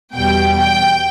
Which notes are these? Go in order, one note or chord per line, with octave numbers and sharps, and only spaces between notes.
E2 B2 G3 G5
G5